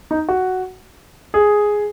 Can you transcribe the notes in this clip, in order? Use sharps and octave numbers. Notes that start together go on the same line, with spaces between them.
D#4
F#4
G#4